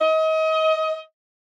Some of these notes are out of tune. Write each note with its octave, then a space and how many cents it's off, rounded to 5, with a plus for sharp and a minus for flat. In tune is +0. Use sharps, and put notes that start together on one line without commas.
D#5 +30